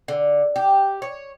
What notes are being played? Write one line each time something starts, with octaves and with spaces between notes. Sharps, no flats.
D3
G4
C#5